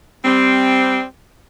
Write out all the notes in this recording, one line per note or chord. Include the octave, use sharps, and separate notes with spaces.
G3 C4